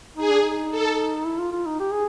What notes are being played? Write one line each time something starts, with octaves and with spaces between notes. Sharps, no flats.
D#4 G#4
D4
D#4
A4
E4
F4
F4
D#4
G4
G#4